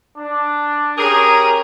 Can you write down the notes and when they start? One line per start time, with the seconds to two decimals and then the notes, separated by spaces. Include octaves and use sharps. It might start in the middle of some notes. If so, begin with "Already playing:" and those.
0.17 D4
0.97 C#4 G4 G#4 A#4 A#5